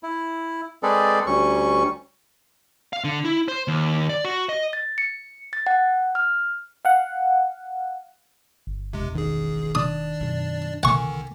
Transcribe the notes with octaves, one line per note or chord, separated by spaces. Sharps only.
E4
G#3 C4 G#4 A4 B4 D5
D2 G3 C#4 C#6
F5
D3
E4
C5
D#2
D5
F#4
D#5
A6
C#7
A6
F#5
F6
F5 F#5
G1
E1 C3 G#3
A1 D#3 G#4
D4 D5 D#6
F#2 B2
C2 D3 D#3 C4 F#5 G#5 C#6